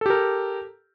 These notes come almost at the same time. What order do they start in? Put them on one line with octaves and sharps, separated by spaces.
A4 G4 A#4